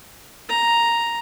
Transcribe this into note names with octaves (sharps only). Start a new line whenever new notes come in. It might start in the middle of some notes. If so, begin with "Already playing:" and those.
A#5